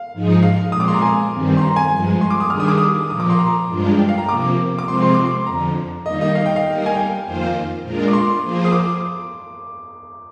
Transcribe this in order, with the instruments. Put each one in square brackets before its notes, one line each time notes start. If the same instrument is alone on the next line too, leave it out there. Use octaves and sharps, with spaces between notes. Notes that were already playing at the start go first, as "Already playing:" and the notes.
Already playing: [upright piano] F5
[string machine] G#2 F3 G#3 D#4 G#4
[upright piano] F5
[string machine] A#2 F3 G#3 C4 [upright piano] D#6
[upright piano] D6
C6
A#5
G#5
[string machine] G2 D#3 G3 C4
[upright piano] C6
A#5
G#5
[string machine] G2 F3 G#3
[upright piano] C6
D6
D#6
[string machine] D#3 G3 D4 G#4 [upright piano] F6
[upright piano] D#6
D6
D#6
[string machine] A#2 F3 A#3 [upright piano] D#6
[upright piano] D6
C6
A#5
[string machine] G2 F3 G#3 D4 F4
[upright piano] G5
F5
A#5
[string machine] C3 F3 A#3 [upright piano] D6
[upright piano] D6
[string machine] C3 F3 G#3 C4 F4 [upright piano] C6
[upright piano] C6
D6
C6
[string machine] F2 D3 F3 [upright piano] A#5
[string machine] D#3 G3 A#3 D#4 [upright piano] D#5
[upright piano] D#5
F5
G5
F5
[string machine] G3 A#3 D#4 A#4
[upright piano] G#5
G5
[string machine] F2 D#3 A#3 F4 C5
A#2 G#3 D4 F4 A#4
[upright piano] D6
C6
[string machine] F3 A#3 F4 G#4 C5
[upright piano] D#6
D6